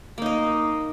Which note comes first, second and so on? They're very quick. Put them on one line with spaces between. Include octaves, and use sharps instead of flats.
A#3 D#4 D#5